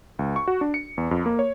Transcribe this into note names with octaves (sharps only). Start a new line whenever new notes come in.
C#2
C#6
F#4
D4
C#7
E2
F2
A#3
C#5